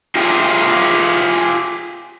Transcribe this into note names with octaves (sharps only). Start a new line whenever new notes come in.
F4 G4 G#4 E5 G5